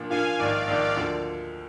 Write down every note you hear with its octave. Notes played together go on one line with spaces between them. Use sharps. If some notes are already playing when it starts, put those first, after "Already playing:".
Already playing: A#2 F3 A#3 D4
A#2 F3 A#3 D4 F5 G#5
A#1 G#2 D#3 D5 F5
A#1 G#2 D#3
D2 D3 F3 A#3